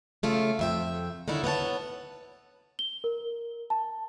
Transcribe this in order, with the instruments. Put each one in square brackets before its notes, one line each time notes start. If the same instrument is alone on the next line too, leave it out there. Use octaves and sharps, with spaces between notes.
[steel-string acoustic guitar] C#3 A3 F4
F2 E5 G5
D3 D#3 D#4 E4 C#5
B3 C#5 F#5 A5
[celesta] G7
A#4
A5